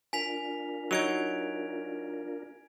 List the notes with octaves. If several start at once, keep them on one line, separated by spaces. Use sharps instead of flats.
D4 F4 A#4 G#5 B6 F7
F#3 D#4 G#6 D7 F7